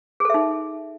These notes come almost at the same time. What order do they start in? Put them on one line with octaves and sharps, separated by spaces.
G#4 A4 E5 D#4